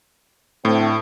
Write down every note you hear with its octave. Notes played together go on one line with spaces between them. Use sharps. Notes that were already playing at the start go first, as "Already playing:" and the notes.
A2 D3 A3 C4